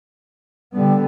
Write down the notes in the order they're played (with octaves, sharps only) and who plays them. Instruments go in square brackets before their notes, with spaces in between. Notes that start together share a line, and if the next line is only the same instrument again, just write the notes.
[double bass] D3 B3 [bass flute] G3